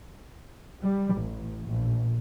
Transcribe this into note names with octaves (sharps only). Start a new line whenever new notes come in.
G3
A1
A#1